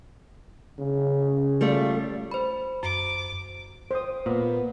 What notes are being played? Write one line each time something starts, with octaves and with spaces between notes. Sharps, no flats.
C#3
G3 A3 F4
C5 B5
F#2 D6
C5 D#6
A#2 B3